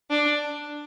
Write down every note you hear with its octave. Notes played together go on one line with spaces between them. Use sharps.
D4